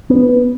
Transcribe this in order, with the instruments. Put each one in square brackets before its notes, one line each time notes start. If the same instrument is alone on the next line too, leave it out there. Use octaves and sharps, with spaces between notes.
[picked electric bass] B3